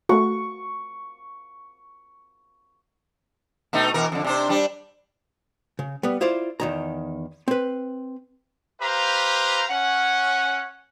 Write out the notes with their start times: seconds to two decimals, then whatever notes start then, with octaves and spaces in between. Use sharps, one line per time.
0.09 A3 F#4 C#6
3.73 B2 A3 D#4
3.94 B2 E3 A#4
4.12 F2 D3
4.24 C3 D4 C5
4.49 G3 D4
5.79 C#3
6.03 G3 B3
6.21 E4 F4 C5 D5
6.60 E2 D#3 A#5
7.48 C4 B4
8.81 G4 B4 C5 F5 A#5
9.69 C#4 F#5